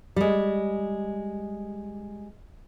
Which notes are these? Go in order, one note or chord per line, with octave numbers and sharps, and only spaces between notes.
G3 G#3